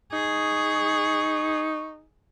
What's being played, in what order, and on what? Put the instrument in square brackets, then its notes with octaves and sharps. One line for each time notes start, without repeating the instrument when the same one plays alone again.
[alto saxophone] D#4 [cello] G#4 [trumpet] C#6